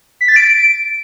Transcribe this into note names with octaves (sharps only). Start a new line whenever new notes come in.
B6
A6
D7